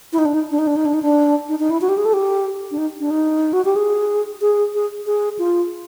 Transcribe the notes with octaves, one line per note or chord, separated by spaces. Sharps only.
E4
D#4
D4
D#4
D4
D#4
D4
D#4
D4
D#4
D4
D#4
D#4
E4
F#4
G4
G#4
A4
G4
D4
D#4
D4
D#4
F#4
G4
G#4
G#4
G#4
G#4
F4